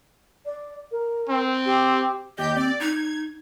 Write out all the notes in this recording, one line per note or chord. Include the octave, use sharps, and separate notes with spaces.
D5
A#4
C4
G4
D#2 G4 D#5 G6
C4 D5
D#4 G#6